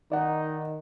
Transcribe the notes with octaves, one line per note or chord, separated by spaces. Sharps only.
D#3 D#4 D5 F#5